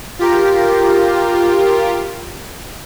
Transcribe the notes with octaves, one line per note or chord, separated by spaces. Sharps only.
F4 G4 A#4